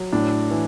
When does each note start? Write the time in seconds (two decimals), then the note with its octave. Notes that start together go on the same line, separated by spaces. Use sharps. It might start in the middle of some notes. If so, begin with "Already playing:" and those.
Already playing: F#3
0.12 A2 D4
0.51 E3